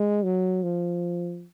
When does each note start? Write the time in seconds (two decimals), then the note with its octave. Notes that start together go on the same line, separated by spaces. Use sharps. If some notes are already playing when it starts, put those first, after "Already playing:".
Already playing: G#3
0.23 F#3
0.63 F3